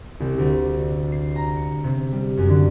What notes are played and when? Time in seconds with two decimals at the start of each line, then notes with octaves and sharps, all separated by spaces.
0.20 C2
0.38 D2
1.12 C7
1.36 A#5
1.57 C#7
1.84 C3
2.12 G3
2.37 F#2
2.49 D3